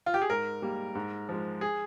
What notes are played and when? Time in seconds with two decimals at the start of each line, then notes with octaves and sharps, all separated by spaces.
0.06 F4
0.14 G4
0.22 G#4
0.30 G#2 A#4
0.62 G3 A#3
0.95 G#2
1.29 F3 G#3
1.61 G#4